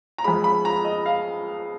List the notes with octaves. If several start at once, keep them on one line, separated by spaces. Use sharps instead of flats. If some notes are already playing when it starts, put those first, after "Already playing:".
A#5
F2 F3 G#3 B5
B5
A#5
D#5
F5